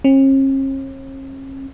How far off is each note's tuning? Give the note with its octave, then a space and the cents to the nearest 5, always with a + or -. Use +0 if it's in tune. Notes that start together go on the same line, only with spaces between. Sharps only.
C#4 -45